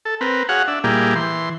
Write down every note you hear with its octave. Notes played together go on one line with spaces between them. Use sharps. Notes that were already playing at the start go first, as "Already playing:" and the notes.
A4
C4 A#4 B4
F#4 G#4 C#5 F5 F#5
D4 E5
A#2 G3 A#3 E4 G4 G#4
E3 C6